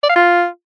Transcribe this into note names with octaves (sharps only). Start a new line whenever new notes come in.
D5
F5
F4